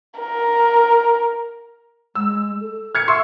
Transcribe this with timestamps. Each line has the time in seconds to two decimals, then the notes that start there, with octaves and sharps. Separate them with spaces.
0.19 A#4
2.15 G#3 E6
2.61 A4
2.95 F6 G#6 C#7
3.08 E5 C6 C#6 E6